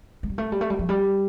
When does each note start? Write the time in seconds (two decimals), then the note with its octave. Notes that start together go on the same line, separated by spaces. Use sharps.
0.23 A3
0.30 G3
0.38 A3
0.52 G3
0.61 A3
0.70 G3
0.79 F3
0.89 G3